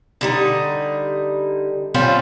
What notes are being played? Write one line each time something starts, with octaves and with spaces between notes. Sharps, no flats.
D3 G3 D#4
G3 C4 C#4 F4